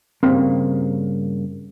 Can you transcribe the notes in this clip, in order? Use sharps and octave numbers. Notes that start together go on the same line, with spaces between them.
G2 C#3 A#3 C4